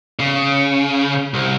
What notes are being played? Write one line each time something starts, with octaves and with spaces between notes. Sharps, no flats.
C#3
C2